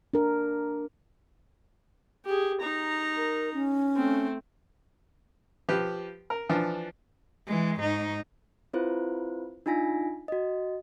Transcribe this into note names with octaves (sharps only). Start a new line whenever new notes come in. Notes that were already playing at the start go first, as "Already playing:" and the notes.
D4 A#4
G4 G#4
D#4 A#5
A#4
C#4
A3 C4
F3 G4 B4
A#4
E3 F3 D4
E3 G#3
G#2 D#4
C4 E4 F4 B4 C5
D4 D#4 F4 G#5 A#6 B6
F#4 D#5